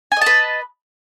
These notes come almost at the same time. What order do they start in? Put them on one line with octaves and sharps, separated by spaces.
G#5 D#5 A5 B4